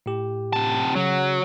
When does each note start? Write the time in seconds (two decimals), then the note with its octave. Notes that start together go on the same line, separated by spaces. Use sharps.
0.06 A2 G4
0.53 C3 A5
0.96 C#3 F#3